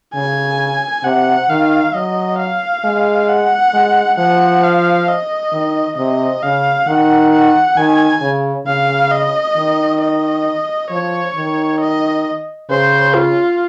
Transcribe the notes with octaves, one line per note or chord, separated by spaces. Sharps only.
C#3 G#5
C3 F#5
D#3 F5
F#3 D#5
F5
G#3
F#5
G#3
F3 F#5
F5
D#5
D#3
C3 D#5
C#3 F5
D#3 F#5
F#5
D#3 G#5
C#3
C#3 F5
D#5
D#3
D#5
F3 C#5
D#3
D#5
C#3 C5
F4